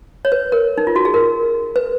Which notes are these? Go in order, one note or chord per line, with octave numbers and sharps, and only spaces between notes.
C#5
B4
A#4
D#4
F4
F#4
G#4
A#4
B4